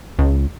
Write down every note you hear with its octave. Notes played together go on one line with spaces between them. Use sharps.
C#2